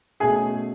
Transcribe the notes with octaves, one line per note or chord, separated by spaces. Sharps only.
B2 A3 C#4 G#4 G#5